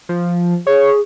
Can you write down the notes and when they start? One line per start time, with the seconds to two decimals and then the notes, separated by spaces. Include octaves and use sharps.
0.09 F3
0.67 G#4 C#5